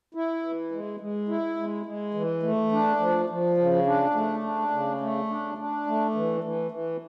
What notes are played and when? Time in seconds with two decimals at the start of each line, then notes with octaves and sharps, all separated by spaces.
0.14 E4
0.43 E3
0.71 G#3
1.00 G#3
1.28 E4
1.57 G#3
1.86 G#3
2.14 E3
2.43 A3
2.72 D4
3.00 F3
3.29 F3
3.57 C#3
3.86 D4
4.14 A3
4.43 D4
4.71 C#3
5.01 A3
5.29 D4
5.58 D4
5.87 A3
6.15 E3
6.44 E3
6.71 E3